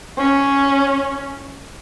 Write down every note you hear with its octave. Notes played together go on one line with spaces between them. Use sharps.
C#4